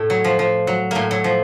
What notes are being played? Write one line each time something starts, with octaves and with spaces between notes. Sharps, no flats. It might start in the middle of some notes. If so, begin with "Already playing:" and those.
Already playing: A2 A3
F#3
F3
F3
F#3
A2 A3 A#3
F#3
F3